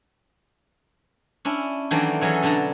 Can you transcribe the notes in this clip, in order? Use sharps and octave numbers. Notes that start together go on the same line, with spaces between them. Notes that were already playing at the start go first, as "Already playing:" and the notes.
C#4 D4 E4
D#3 E3 F#3 A3 A#3 D4
E3 F#3 C#4 G#4 A4
B2 D3 D4 A5 A#5